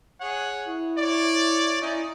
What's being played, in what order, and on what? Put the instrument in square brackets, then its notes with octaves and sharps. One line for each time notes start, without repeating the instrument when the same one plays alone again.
[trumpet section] G#4 C#5 F#5
[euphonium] E4
[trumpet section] C#5 D5
[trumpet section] C#4 D#4 [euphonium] E4